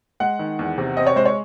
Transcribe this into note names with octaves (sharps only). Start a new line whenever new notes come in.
G#3 F#5
D#3
E2
C3
C4 D#5
C#5
G#3 C5
C#5